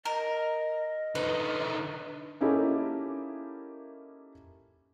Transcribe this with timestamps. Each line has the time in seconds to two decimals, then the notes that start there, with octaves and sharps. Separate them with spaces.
0.05 A#4 D#5
1.15 D3 D#4 B4
2.41 A#3 C#4 D#4 E4 G4 A4